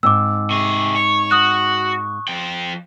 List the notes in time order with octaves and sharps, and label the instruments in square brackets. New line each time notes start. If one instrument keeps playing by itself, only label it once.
[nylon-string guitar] G#2 C4 [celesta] D6 E6
[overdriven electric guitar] C3 G#4 [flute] C#6
[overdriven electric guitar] C#5
[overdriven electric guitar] F#4 [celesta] D#6 F#6
[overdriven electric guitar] F3 G5